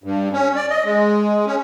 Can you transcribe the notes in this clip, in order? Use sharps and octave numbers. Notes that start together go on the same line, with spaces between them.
G2
C#4
D5
D#5
G#3
C#4